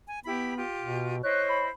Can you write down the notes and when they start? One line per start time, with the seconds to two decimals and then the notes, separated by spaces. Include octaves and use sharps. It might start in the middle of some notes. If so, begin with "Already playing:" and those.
0.09 G#5
0.25 B3 E4 G4 B5
0.56 F4 G4
0.82 B2
1.23 E4 C5 C#5 D#5 F#6
1.49 B5